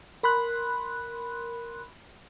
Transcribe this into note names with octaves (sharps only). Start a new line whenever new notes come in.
A#4 B5 C6 F#6